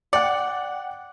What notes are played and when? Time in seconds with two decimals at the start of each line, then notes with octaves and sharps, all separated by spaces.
0.13 D5 F#5 G5 C#7